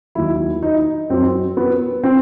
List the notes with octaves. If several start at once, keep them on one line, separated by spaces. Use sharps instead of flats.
D#2 D#3 F#3 E4
D#4
F#2 F#3 C4
B3
C4